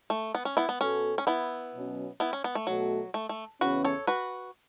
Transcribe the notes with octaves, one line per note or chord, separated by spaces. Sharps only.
A3
B3
C#4
B3 E4
B3
B2 B3 C#4 F#4 A4
C#4
B3 E4
B2 F#3 C#4
B3 E4
C#4
B3
A3
B2 F#3 A3 F#4
A3
A3
E2 C#3 E3 C#4 F#4 B4
A4 C#5
F#4 B4